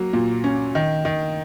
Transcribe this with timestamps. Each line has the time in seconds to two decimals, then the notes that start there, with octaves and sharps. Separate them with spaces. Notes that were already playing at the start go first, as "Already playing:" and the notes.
Already playing: F#3 A#3
0.13 A#2
0.44 C#4
0.75 D#3
1.05 D#3